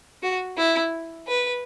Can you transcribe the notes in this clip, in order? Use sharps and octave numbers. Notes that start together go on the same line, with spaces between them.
F#4
E4
B4